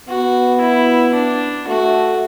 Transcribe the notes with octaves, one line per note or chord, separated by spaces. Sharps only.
B3 F#4
E4
D4
A3 F#4